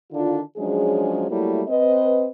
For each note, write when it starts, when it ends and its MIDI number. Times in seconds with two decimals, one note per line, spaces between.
0.11 0.40 50
0.11 0.40 51
0.11 0.40 62
0.11 0.40 64
0.11 0.40 65
0.57 1.25 53
0.57 1.25 54
0.57 1.25 56
0.57 1.25 61
0.57 1.25 62
0.57 1.25 68
1.30 1.62 54
1.30 1.62 55
1.30 1.62 57
1.30 1.62 58
1.30 1.62 64
1.68 2.28 60
1.68 2.28 71
1.68 2.28 75